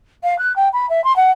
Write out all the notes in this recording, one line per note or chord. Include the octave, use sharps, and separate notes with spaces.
F5
F#6
G5
B5
E5
C6
F#5